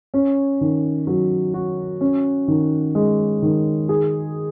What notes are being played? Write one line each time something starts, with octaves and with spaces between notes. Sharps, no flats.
C#4
D#3
F#3
F#4
C#4
D#3
G#3
D#3
G#4